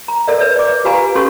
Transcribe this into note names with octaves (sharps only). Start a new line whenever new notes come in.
A#5
A4 A#4 D5 E5
B4 C#5 E5
D5 D6
F4 G4 B4 F5 G#5 A#5
C#4 F4 G4 A4 C6 C#6